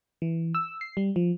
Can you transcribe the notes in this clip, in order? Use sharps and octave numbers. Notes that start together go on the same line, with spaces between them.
E3
E6
C7
G3
F3